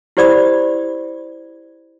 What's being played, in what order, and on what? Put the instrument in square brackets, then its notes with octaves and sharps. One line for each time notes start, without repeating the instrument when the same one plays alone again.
[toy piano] E4 G4 C5 D5 B5 D#6